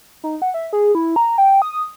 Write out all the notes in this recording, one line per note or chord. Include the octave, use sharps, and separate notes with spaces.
D#4
F#5
E5
G#4
E4
A#5
G5
D#6